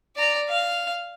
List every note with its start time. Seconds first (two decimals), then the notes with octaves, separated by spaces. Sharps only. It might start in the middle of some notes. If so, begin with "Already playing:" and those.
0.16 D5 A#5
0.49 F5